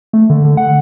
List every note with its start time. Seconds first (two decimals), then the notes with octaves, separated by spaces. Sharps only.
0.13 A3
0.30 D3
0.44 D3
0.57 F#5